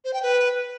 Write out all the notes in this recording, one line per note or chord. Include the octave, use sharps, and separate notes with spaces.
C5
G5
B4